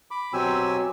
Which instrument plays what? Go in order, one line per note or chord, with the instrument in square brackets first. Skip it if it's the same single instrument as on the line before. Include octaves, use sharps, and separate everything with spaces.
[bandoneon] B5 D6
B2 F#3 C4 G4 G#5 E6